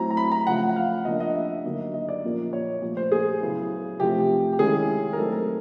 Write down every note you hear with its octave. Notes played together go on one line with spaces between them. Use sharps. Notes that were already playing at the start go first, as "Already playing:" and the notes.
Already playing: F#3 A3 C4 E4 A#5
A#5
B5
A#5
C#3 F3 A3 F#5
F#5
F5
C#3 F3 A#3 D4 D#5
D#5
E5
D3 F#3 A#3 D#4
D#5
D5
A#2 F3 A#3 C#4
C#5
A#2 F3 A3
C5
G#4
C#3 F#3 B3 E4
C3 F3 A3 C4 G4
G4
D#3 G#3 C#4 E4 G#4
A#4
F#3 A3 C4 D#4 A4
A#4